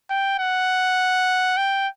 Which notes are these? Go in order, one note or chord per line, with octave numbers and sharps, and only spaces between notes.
G5
F#5
G5